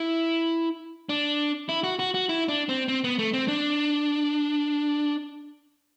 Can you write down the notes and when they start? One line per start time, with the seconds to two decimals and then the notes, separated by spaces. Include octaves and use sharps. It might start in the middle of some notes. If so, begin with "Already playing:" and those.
Already playing: E4
1.09 D4
1.69 E4
1.84 F#4
1.99 F#4
2.14 F#4
2.29 E4
2.48 D4
2.69 C4
2.88 C4
3.04 B3
3.19 A3
3.34 C4
3.48 D4